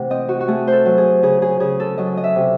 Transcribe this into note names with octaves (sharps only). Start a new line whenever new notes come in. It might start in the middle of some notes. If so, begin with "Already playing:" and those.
Already playing: C3 E3 A3 F#5
C4 D#5
F#4
F#4
A3 G#4
A4 C5
F#3
G#4
C#3 G#4
G#4
C#3 G#4
A4
F#3 D#5
D#5
E5
C3